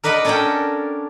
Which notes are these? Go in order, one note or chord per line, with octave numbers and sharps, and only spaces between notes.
A#4 B4 D5 D#5 F#5 B5
C#4 D4 A4 A#4 F#5 G5